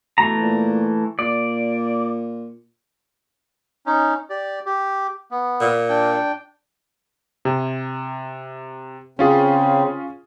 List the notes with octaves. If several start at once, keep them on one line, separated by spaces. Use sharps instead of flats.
B2 E3 A3 A#5
A#2
A#2 D5
C#4 D#4
G4 D5
G4
B3
A#2
D4 G5
C3
C#3 C4 C#4 F4 G#4